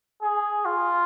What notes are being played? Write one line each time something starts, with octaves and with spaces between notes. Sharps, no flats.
G#4
F4